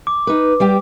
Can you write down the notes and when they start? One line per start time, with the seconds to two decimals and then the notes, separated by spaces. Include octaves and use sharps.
0.07 D6
0.27 D#4 B4
0.60 G3 G4 G5